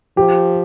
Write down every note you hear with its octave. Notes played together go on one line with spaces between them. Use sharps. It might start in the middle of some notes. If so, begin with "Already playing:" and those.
F3 G4